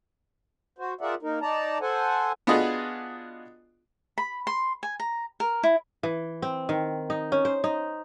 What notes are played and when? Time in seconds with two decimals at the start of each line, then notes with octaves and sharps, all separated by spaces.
0.78 F#4 C5
1.01 F4 G#4 A#4 D5 E5 F#5
1.22 A#3 D#4 A#4
1.42 D#4 D5 A5 A#5
1.81 A4 C5 F#5 G#5
2.47 B3 D4 F4 F#4 G#4 D#5
4.18 B5
4.47 C6
4.83 G#5
5.00 A#5
5.40 A#4
5.63 E4
6.03 E3
6.42 C4
6.69 D#3
7.10 D#4
7.32 C#4
7.45 C5
7.64 D#4